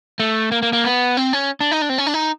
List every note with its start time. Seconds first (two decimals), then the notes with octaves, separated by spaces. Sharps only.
0.20 A3
0.51 A#3
0.62 A#3
0.73 A#3
0.84 B3
1.17 C4
1.33 C#4
1.61 D4
1.71 D#4
1.82 D4
1.89 C4
1.98 C#4
2.07 D4
2.14 D#4